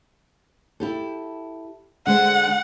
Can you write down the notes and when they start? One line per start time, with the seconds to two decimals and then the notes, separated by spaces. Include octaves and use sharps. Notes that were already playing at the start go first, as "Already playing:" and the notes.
0.80 E4 G4 A4
2.07 D3 G#3 C5 F#5